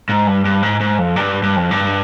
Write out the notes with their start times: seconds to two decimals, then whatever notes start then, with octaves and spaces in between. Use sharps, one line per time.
0.09 G#2
0.27 G2
0.45 G2
0.63 G#2
0.80 G#2
0.99 F2
1.16 G2
1.43 G2
1.56 F2
1.71 G2